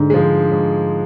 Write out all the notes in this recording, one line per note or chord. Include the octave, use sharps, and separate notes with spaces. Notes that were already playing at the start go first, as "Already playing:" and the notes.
Already playing: G#2 D3
F3 G#3
G#2